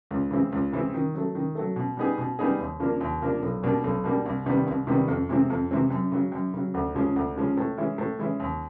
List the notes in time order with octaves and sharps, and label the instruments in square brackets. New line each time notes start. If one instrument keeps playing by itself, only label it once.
[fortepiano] C#2
C#3 E3 G#3 C4
C#2
C#3 E3 G#3 C4
D#3
F#3 A3
D#3
F#3 A3
B2
G3 B3 D#4 G#4
B2
G3 B3 D#4 G#4
D#2
C#3 F3 A#3 D4
D#2
C#3 F3 A#3 D4
B1
B2 G3 A#3 D4
B1
B2 G3 A#3 D4
C2
C3 D#3 G3 B3
C2
C3 D#3 G3 B3
F2
C3 E3 G#3 C4
F2
C3 E3 G#3 C4
F#2
C#3 F#3
F#2
C#3 F#3
D2
C#3 F3 G#3 C#4
D2
C#3 F3 G#3 C#4
A2
E3 G#3 C#4 E4
A2
E3 G#3 C#4 E4
D#2